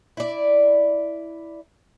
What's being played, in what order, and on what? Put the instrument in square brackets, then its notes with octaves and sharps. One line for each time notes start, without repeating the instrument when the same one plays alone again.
[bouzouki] E4 D5